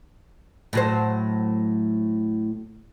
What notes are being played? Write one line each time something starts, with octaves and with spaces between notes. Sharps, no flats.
A2 F#3 C5